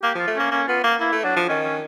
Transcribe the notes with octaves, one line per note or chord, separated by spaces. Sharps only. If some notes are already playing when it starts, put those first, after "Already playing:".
A#3 G4
F3 F4
A3
A#3 C#4
A#3 C#4
B3 F4
A#3
A#3 E4
A3
F#3 D4
F3
D#3 C#4
C#4